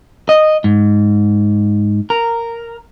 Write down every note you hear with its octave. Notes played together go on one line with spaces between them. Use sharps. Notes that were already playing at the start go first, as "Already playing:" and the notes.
D#5
G#2
A#4